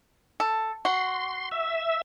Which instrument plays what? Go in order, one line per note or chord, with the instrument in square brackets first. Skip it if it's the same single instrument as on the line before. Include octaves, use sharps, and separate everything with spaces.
[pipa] A4
[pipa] F#4 [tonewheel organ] C6
[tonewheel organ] E5